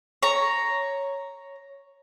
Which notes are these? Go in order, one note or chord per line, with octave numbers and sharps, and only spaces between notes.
C#5 A#5